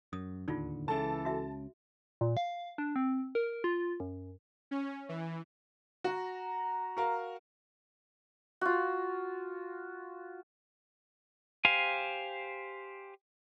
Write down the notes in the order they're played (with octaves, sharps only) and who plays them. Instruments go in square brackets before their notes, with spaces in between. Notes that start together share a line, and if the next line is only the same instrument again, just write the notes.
[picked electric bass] F#2 [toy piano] D#6
[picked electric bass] D1 D#2 D3 [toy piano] D#4 F4
[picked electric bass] C#2 C#3 [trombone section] E3 A4 [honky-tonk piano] A5
[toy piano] F#4 E5
[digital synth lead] A#2
F5
D4
C4
A#4
F4
F#2
[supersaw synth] C#4
E3
[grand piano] F#4 [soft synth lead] A#5
[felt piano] F#4 A#4 F5
[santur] F4 F#4
[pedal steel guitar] G4 C5 F5 G#5